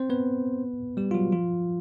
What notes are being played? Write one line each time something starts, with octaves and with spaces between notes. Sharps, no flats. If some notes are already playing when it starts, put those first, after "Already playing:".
Already playing: C4 C5
B3 B4
G3 G4
F4
F#3 F#4
F3 F4